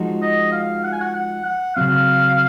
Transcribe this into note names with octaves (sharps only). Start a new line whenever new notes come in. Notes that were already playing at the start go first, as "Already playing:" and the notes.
Already playing: F3 G#3 D#4 F#4
D#5
F5
F#5
G#5
F#5
F#5
F#5
C#3 F#3 C4 F5